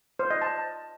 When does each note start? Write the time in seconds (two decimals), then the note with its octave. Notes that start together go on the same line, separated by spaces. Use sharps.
0.19 C5
0.30 D#5
0.42 A5